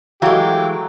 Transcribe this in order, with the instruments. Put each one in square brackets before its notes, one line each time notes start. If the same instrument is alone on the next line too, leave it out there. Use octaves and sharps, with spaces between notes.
[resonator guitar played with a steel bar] E3 G#3 [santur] F#3 A3 [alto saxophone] G4 [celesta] F5